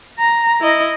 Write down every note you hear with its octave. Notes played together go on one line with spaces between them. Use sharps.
A#5
E4 D#5